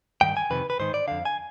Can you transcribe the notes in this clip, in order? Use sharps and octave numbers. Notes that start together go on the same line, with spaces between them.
G2 D#3 G5
G#5
F2 C3 D#3 B4
B4
G#2 D#3 C5
D5
F2 D3 F5
G#5